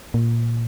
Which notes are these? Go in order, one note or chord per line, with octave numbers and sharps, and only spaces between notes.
A#2